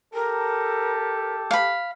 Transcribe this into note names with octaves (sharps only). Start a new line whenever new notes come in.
G4 A4 A#4
F5 B5